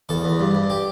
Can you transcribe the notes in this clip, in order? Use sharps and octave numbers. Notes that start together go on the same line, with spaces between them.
E2 A4
E2
G2
G2
G4